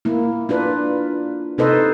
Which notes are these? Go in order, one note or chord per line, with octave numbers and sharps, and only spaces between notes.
A#3 E4
D4 F4 B4
C3 D#4 A4 B4 C5 D#5